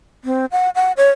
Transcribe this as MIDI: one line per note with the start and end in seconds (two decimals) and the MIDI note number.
0.25 0.45 60
0.52 0.70 78
0.75 0.92 78
0.97 1.10 73